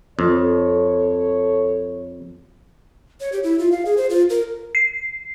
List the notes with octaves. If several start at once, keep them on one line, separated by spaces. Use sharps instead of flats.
F2 A4 C#5
C#5
G4
E4
F4
F5
G#4
C5
F4
A#4
C7